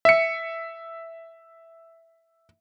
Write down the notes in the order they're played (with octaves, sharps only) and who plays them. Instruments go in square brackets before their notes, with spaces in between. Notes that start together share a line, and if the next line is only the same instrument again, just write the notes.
[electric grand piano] E5 C#7